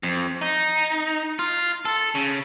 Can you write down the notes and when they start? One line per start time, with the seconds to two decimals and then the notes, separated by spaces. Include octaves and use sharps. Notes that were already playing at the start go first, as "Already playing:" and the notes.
0.03 F2
0.41 D#4
1.39 F4
1.85 A4
2.15 C#3